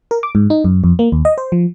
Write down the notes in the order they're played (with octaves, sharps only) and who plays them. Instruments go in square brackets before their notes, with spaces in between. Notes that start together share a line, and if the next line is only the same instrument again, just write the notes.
[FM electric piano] A#4
D6
G#2
D#4
F#2
F2
A#3
D#2
D#5
C5
F3